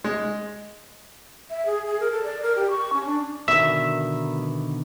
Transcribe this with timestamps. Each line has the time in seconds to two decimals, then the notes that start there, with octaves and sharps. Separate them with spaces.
0.04 G#3
1.50 E5
1.66 G#4
1.87 G#4
2.00 A#4
2.12 A4
2.24 D5
2.42 A#4
2.56 G4
2.70 C#6
2.93 C#4
3.05 D4
3.48 B2 D3 D#3 E5